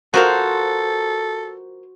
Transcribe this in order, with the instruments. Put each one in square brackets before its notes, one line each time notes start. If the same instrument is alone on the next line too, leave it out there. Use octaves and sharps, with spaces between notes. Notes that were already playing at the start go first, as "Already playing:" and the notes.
[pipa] F3 A#4 F5 [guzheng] F#4 C5 [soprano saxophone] A4